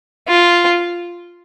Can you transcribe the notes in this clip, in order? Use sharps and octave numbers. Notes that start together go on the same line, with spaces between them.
F4